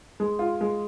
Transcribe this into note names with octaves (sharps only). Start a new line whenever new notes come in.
G#3
F4
G#3